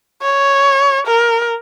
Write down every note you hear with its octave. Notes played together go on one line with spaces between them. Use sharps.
C#5
A#4